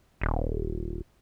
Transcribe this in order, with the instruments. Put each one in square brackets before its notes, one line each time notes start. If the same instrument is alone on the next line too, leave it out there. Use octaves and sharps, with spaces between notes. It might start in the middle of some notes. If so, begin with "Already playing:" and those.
[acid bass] D#1